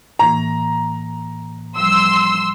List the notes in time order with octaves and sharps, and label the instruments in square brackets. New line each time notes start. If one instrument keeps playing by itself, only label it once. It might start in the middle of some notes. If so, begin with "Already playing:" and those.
[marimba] A2 E3 A#3 [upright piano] A#5
[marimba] F3 G3 [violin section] C6 E6